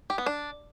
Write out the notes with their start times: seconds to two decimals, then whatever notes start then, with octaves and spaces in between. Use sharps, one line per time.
0.10 G4
0.18 B3
0.26 D4